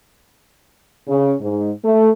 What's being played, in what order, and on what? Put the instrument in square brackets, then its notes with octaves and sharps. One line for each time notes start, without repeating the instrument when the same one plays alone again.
[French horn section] C#3
G#2
A3